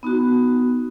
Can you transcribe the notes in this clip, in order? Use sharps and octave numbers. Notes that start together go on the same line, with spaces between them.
B3 D#4 F#4